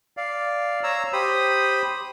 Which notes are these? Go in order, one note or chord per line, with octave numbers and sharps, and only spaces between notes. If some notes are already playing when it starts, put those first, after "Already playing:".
D5 F5
C#5 A#5 E6
G4 C5 B5 D#6